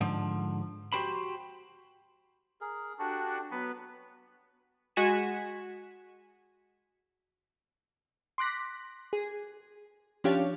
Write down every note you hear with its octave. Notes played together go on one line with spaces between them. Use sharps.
G#2 D3 F3
F#4 G4 C5 B5
G#4 A#4
D4 F#4 G4 A4
F#3 B3 B4
G#3 F#4 G#5 B6 C#7 E7
C6 D6 F#6 A#6 B6
G#4
F3 C#4 D4 G4 C#5 F5